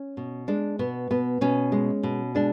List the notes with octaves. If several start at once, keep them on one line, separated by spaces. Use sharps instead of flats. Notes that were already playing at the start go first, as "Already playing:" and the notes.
Already playing: C#4
B2
G#3 D4
B2 B3
B2 B3
B2 C#4
G#3
B2
G#3 D4